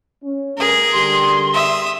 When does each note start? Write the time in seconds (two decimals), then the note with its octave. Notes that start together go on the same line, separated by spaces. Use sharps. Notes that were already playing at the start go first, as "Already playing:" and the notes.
0.23 C#4
0.57 G2 A3 G#4 A#4
0.92 D3 G3 G4 C6
1.53 E5 D#6